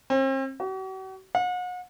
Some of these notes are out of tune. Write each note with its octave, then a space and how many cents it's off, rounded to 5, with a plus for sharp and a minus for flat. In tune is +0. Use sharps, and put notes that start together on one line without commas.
C4 +40
F#4 +45
F#5 -40